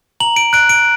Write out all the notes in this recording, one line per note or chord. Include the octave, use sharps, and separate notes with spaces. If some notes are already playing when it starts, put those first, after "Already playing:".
A#5 F#7
D7
F#6 D7
D7